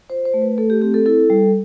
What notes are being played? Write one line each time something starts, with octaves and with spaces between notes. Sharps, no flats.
F4 C5
C5
A3
B4
A3 A4
G4
C4 G4
A4
E4 A4
G3